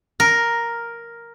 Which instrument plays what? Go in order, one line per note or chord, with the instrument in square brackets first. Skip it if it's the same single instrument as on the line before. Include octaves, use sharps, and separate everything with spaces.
[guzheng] A#4